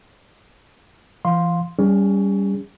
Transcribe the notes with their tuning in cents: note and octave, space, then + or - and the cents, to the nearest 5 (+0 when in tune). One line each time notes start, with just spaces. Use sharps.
E3 +45 F5 +10 C6 +0
G3 +0 C#4 +25 G#4 -40